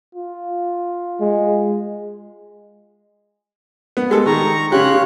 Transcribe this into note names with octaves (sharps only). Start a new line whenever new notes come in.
F4
G#3
B3
G3 G#3 A4
D#3 A#5 C#6
C#3 F4 G4 C#5 F#6